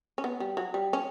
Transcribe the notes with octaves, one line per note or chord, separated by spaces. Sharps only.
C#4
B3
G3
F#3
G3
C#4